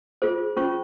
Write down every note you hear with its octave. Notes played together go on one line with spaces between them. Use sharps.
F4 G#4 C5
C#4 F4 C5 C#6